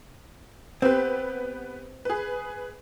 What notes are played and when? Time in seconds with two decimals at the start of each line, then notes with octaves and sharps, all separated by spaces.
0.82 B3 C4 G4 B4
2.05 G#4 B4